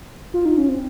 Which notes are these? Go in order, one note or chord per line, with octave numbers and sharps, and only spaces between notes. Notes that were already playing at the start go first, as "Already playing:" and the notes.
F4
D#4
C#4
C4